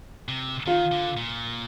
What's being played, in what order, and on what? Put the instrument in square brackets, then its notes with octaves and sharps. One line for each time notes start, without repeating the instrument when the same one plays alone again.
[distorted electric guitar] C3
[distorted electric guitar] D#3 [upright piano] F4
[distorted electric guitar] D3
A#2